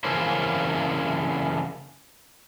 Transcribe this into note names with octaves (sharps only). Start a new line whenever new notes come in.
C#3 E3 A#3 C#4 C5